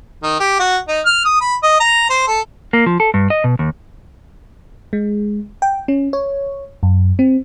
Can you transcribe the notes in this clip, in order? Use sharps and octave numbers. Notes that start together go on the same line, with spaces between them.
D#3
G4
F#4
D#4
F6
D#6
B5
D#5
A#5
C5
A4
A#3
F3
A4
G2
D#5
B2
D#2
G#3
G5
C#4
C#5
F#2
C4